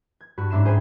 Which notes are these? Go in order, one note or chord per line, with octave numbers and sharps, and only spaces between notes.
G#6
G2 F#4 B5
G#2 C#4 D4 E5 C6 E7
G#4 C5 G5 G#5 B5